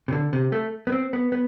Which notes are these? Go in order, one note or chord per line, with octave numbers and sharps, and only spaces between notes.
C3
D3
C3
A3
B3
C4
B3
B3